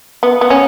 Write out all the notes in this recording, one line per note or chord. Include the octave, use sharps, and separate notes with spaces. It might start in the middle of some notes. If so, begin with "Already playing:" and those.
B3
B3
C#4